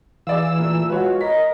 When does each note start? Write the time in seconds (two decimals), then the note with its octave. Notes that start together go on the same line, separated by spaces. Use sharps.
0.27 E3 G#4 D5 F5 E6
0.58 A#2 A3
0.89 G#3 F4 F#4 B4 C#5
1.21 A#4 D#5 B6